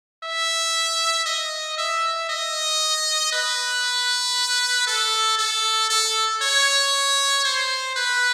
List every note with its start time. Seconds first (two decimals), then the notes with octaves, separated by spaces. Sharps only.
0.23 E5
1.26 D#5
1.78 E5
2.29 D#5
3.33 B4
4.87 A4
5.38 A4
5.90 A4
6.42 C#5
7.45 C5
7.96 B4